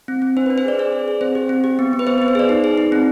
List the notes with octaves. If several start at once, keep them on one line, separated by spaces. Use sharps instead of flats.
C4
C4
D4 C5
B4
D4
C5
G#4 D5
G#4 D5
G#4
G#4
C4 C5
G4
C4
G4
B3
B3
B4
B3 C5
B4
B3
C5
G#4 D5
D#4
G#4
D#4
C4